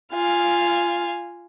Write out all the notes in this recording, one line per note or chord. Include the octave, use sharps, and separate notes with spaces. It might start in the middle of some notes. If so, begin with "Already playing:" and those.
F4 F5 G#5